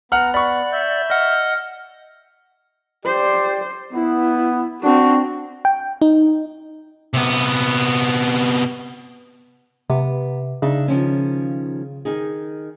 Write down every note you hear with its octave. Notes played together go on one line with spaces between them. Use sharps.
B3 F#5 A#5 F6
D5 F#5 B5 C#6
E5 G6
D#5 F#5 F6
G4 C5 D5
B3 E4
C4 D4 F#4
G5
D#4
C3 B3
C3 B3
C#3 D4 D#4 E5
D#3 F3 C#4
D#3 D#4 G#4